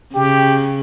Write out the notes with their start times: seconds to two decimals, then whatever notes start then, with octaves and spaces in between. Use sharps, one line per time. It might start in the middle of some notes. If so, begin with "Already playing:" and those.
0.14 C#3 G4